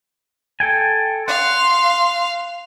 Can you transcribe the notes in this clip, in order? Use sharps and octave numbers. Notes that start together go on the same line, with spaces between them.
A4 G5 G#5
F5 F#5 C6